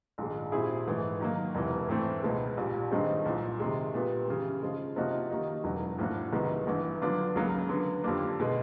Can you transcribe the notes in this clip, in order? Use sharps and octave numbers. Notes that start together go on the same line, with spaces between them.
A#1 G#2 D#3 G#3
A#2 G3 C4 E4 G#4
G#1 G#2 E3 A3
D#3 F#3 A#3
E1 E2 C3 E3
A2 E3 A3 C4
C#2 B2 G#3
A#1 A#2 G3
G2 D#3 G#3 C4 D#4
C2 A#2 F3
C3 D#3 G#3
A#2 G3 B3
C#3 E3 G3
C#3 F3 G#3
C3 F3 A#3 D#4 F#4
D#3 G3 A#3 D#4
E1 E2 C#3 F#3
A2 F3 A#3 D4 F#4
C2 C3 D#3 G#3 B3
A1 G2 E3
D3 F#3 B3 D4 F4
C#2 C#3 F#3 A#3
D3 F#3 B3
F2 D3 G3 A#3 D4
B2 G#3